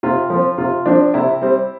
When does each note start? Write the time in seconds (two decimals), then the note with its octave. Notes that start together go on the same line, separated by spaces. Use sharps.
0.03 C3 F4
0.30 F3
0.35 C4
0.58 C3 F4
0.86 F3 C4 D4
1.14 C3 E4
1.42 G3 C4